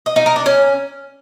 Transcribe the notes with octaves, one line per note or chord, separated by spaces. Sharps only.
D#5
D#4
A#4
D4
C#4